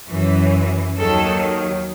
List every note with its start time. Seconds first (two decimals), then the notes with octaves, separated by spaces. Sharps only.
0.09 F#2 E3
0.97 D#2 D#3 F#3 A4